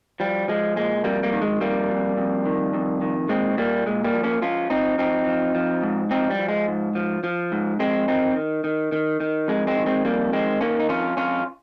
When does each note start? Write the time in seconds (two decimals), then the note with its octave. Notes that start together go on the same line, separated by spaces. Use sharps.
0.20 F3 G3
0.48 F3 G#3
0.76 A#2 G#3
1.04 F2 G3 A#3
1.23 G3 A#3
1.33 D#3
1.42 G#3
1.60 F2 G3 A#3
1.89 F2
2.17 F2
2.45 D#3
2.74 F2
3.01 D#3
3.29 A#2 G#3 C4
3.57 A#2 G3 A#3
3.86 A#2 G#3
4.04 G3 A#3
4.14 F3
4.23 A#3 C#4
4.42 F3 C#4 F4
4.70 F3 C4 D#4
4.98 F3 C4 D#4
5.27 F3
5.55 F3
5.83 G#2
6.11 F3 C4 D#4
6.30 G3
6.39 F3
6.48 G#3
6.68 G#2
6.95 F3
7.24 F3
7.52 G#2
7.79 F2 G#3 C4
8.08 D#3 C4 D#4
8.36 D#3
8.64 D#3
8.92 D#3
9.20 D#3
9.48 F2 G#3
9.67 G#3 C4
9.76 D#3
9.86 G#3 C4
10.05 F2 G3 A#3
10.33 D#3 G#3 C4
10.61 D#3 A#3 C#4
10.80 D#4
10.89 F2 C#4 F4
11.17 F2 C#4 F4